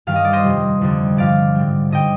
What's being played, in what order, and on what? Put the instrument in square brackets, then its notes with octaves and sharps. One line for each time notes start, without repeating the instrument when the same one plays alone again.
[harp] G2 D#3 G3 F5
D#5
D5
C5 D#5
F2 C3 G3
F2 D3 G3
G2 F3 D5 F5
G#2 G3
G2 D3 G3 D#5 G5